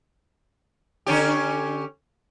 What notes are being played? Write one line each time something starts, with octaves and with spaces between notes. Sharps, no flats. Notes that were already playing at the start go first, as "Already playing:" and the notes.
D3 C#4 G4